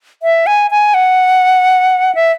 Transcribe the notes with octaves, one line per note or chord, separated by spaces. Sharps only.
E5
G#5
G#5
F#5
E5